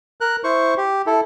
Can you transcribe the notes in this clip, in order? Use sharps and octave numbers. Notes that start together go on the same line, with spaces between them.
A#4 F#6
E4 C5 C#6
G4
E4 A4